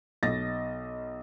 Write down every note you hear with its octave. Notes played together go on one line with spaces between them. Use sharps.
B1 D#5 A6 A#6